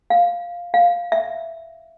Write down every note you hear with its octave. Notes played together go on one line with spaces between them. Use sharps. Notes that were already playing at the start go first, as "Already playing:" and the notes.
F5
F5
E5